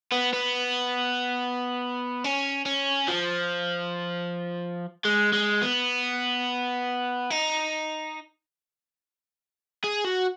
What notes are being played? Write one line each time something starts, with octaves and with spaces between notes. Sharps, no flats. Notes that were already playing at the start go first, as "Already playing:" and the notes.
B3
B3
C#4
C#4
F3
G#3
G#3
B3
D#4
G#4
F#4